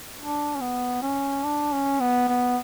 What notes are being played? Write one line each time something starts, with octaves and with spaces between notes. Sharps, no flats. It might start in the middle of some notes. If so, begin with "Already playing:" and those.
D4
C#4
B3
C#4
D4
C#4
B3
B3